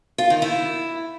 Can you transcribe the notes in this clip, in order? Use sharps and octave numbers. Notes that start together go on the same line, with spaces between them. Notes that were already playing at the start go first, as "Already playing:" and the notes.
F4
D#3
E4